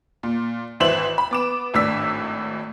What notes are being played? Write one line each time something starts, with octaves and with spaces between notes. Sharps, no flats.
A#2
G#1 E3 C5 E5 E7 F#7
B5
B3 D6 E7
G#1 A2 D4 E6 B6